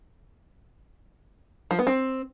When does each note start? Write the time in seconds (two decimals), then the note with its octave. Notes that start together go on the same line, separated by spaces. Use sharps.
1.71 F3
1.79 B3
1.87 C4